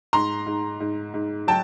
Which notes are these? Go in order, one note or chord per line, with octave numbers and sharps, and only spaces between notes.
G#2 A#5 C6
G#2
G#2
G#2
F#3 G5 A5